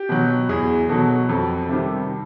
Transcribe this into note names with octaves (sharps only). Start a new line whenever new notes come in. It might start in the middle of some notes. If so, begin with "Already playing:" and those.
Already playing: G4
B2 F#3
E2 G#4
B2 F#3 A4
F2 A4
C3 D#3 G3